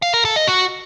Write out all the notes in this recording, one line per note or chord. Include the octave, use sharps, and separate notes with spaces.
F5
A#4
A4
D#5
F#4